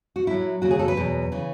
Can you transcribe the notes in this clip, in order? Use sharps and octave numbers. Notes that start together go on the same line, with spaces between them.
F#4
A2 F#3 E4
D#2 C#3 F#3 F#4
G#4
A4
B4
E2 B2 F#3
C#3 E3